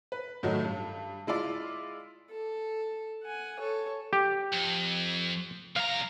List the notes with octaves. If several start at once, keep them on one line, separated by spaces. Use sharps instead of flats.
B4
A2 D#3 F#3 A3 D#4
G2
G#3 E4 F4 D5
A4
F#5 G#5
A4 C#5
G4
F2
C2 F5 A#5